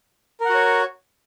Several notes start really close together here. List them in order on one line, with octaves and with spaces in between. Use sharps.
A#4 F#5 F#4 C#5